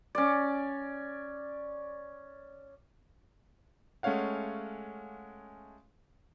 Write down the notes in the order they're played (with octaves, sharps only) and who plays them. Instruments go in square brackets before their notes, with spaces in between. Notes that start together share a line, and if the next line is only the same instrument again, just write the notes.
[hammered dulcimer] C#4 D5
[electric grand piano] G#3 A3 C#4 C#5 F5 F#5